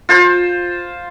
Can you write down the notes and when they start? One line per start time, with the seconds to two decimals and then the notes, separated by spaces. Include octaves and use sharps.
0.09 F4 C5